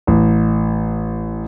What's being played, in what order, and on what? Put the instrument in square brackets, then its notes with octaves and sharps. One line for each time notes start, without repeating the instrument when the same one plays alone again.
[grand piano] A1